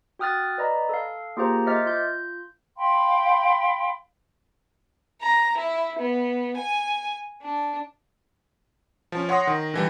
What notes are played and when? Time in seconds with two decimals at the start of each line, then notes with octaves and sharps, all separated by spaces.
0.19 F#4 G5 D#6 F6 F#6 A6
0.58 B4 D5 D#5 A#5 B5
0.89 A4 F5
1.37 A#3 F4 G4 G#4 C5 A#5
1.66 C5 D#5 E5 D6 F6 A6
1.86 F4 G6
2.77 F5 G5 B5 C6
5.22 A#5
5.57 E4
5.99 B3
6.57 G#5
7.42 D4
9.12 F3 C#4
9.29 C#5 F#5 C6 D#6 A#6
9.47 D#3
9.74 D3 E3 G3